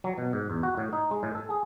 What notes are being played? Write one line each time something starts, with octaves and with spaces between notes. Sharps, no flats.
F#3
B2
G#2
E2
F#4
A2
D#4
G#3
A2
A4
G#4